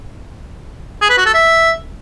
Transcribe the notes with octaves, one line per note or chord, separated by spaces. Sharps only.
G#4
B4
F#4
A4
E5